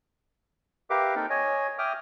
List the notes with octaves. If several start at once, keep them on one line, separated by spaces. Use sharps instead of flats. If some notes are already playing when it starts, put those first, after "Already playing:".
G4 A#4 B4 E5 F5 D6
A#3 C4 D#4 A4
C#5 D#5 G#5
E5 G5 D6 D#6 F6